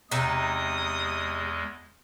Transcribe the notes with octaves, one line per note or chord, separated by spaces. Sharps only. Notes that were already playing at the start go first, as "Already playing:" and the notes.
E2 C3 G#3 D#4 D#6